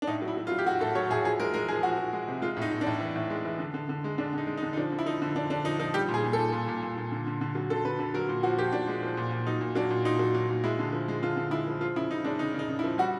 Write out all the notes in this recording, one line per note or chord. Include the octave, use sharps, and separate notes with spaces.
D4
A2 D#4
F#3
E4
F#3
F4
F#3
G4
F#3 F#4
A2 A4
F#3 C#5
A2 G#4
F3 G#4
G#3 A#4
G#3 A#4
F3 G#4
F3 F#4
F3
G#3
C3
G#3 F4
A2 D#4
A2
D4
A2
E3
A2
G#3
E3
D3
D3
D3
G#3
D3 D4
D3 D#4
G#3
D#4
D3
D#4
F3 D4
D3
E4
F3 D#4
D3
D3 D4
D3 D4
F3 D#4
F3 D#4
G3 G4
A#2
G#4
A#2
A4
A#2
A#2
A#2
A#2
A#2
D3
D3
D3
F#3
D3 A4
D3 B4
D3 B4
F#3 A#4
A#2
F3 F#4
F3 G4
A#2 D4
G#3
F3
A#2
A#2
F#3 D#4
A#2
F#3 D4
A#2
A#2 D#4
F#3
F#3
A#2
G#3 E4
D3
F3
G#3
D3 F4
D3
G#3 E4
F3
F3 F4
C#3 E4
C#3 D#4
G#3 D4
C#3 D#4
C#3 D#4
C#3
E4
F3
G3 F#4